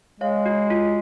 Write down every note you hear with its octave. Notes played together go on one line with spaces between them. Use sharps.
G#3 C#5 F5
F#4
F4